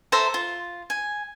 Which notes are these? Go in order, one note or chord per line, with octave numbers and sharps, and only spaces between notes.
A4 C5 E5 A#5
F4
G#5